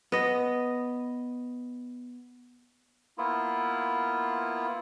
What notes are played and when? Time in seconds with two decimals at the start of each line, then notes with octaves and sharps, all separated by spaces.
0.12 B3 D#5
3.18 A#3 B3 E4 F4